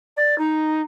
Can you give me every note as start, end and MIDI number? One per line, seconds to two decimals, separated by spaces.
0.16 0.37 74
0.38 0.81 63